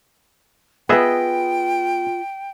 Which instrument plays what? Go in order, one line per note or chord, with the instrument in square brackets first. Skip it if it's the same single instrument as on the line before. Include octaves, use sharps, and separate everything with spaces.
[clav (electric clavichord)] B3 G#4 E5 [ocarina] F4 [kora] B4 D#5 [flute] G5